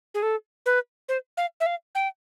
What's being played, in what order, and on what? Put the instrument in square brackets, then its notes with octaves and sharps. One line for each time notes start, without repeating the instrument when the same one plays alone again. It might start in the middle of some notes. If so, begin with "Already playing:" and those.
[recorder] G#4
A4
B4
C5
F5
E5
F5
G5